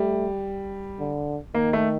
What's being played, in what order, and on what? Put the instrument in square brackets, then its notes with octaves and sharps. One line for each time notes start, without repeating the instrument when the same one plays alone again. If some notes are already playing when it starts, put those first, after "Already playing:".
Already playing: [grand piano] G3 [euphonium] A3
[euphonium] D3
[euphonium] D#3 [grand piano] A#3
[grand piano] A3